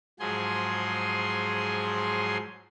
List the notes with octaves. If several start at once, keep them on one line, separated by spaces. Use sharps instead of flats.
G#2 F3 F#3 G#4 G#5 C6